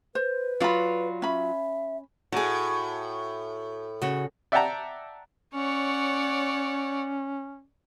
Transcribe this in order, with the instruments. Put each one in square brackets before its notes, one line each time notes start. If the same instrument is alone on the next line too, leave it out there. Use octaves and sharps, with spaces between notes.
[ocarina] B4 [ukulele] C5
[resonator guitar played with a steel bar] F#3 F4 [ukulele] D5 B5
[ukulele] C#4 B5 [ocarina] E5
[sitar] A2 [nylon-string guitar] F#4 G#4
[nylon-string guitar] C#3 F#4 C#5
[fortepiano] D5 E5 F#5 G5 A5 A#5
[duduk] C#4 [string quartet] C#5 D5 F#5